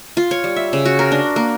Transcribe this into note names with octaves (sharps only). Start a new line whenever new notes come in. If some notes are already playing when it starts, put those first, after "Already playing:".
F4
C#5
G3
E5
C#3
F#4
A#4
D4
A#3